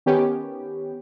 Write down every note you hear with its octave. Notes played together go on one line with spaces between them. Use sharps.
D#3 B3 C#4 G4